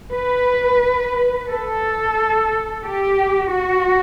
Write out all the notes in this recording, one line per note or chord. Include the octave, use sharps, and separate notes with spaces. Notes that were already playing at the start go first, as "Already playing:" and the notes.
B4
A4
G4
F#4